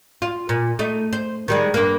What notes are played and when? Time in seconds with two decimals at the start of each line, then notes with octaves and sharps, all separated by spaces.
0.22 F4
0.49 A#2
0.79 A3 D#4
1.13 C5
1.48 D#3 G3 G#3
1.74 G2 A#3